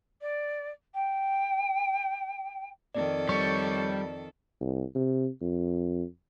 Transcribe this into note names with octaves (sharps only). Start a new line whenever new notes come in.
D5
G5
F2 D#3 A4 D5
G3 C#5 C#6
C2
C3
F2